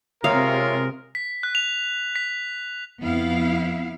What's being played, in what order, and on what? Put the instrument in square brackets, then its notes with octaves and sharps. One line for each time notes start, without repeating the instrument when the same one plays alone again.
[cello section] C3 [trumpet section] G#3 F4 A#4 [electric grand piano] C#5 E5 D#6 [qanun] F5
[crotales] B6
F#6
F7
B6
[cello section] F2 B3 E4 F5